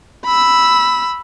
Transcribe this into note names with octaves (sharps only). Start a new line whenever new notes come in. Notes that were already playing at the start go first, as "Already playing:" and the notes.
B5 E6